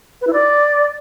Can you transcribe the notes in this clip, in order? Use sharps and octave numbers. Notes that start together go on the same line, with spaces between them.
B4
E4
D5